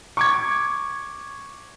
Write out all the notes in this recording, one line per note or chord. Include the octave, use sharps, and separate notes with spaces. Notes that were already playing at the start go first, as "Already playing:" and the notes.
C#6 D6 G#6